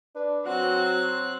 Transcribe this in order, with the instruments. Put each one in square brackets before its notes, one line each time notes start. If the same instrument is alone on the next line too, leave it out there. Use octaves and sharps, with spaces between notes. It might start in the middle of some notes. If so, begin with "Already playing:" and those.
[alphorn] D4 [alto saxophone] B4
[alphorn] F#3 [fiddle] C4 F#6 [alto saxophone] F#4